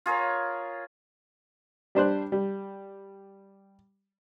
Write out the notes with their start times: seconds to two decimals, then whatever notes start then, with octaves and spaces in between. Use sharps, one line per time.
0.06 F4 G#4 A#4 C#5
1.95 G3 D4 C5 F#6
2.32 G3